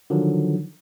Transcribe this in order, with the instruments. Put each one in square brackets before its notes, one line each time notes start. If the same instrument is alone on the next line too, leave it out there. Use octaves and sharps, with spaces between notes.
[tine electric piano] D3 D#3 F3 F#3